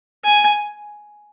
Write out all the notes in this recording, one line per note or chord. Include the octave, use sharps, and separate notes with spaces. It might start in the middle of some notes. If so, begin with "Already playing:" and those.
G#5